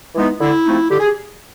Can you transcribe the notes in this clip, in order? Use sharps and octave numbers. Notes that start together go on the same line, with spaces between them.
E3 G#3 B3 D#4
D3 E4
F3 A3 C4 D#4
D3 G4
G#4